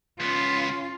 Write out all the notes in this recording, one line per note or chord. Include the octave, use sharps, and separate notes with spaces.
C#2 B3 C#4 F4